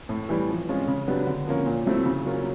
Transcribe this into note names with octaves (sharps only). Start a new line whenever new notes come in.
A2
E3 G3
F3
G#3 C#4 F4
C#3
F#3 B3 D4 G4
D3
F3 A#3 C#4
A#2
F#3 A3 C4 E4
C#3
F#3 A#3 C#4 F4